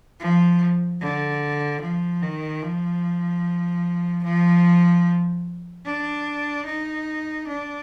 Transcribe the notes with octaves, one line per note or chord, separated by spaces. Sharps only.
F3
D3
F3
D#3
F3
F3
D4
D#4
D4